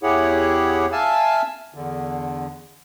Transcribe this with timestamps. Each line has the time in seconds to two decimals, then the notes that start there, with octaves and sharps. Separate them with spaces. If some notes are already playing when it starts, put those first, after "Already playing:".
0.03 E2 E4 G4 G#4 C#5 F#5
0.92 E5 F5 G#5 A5 E6
1.74 E2 D3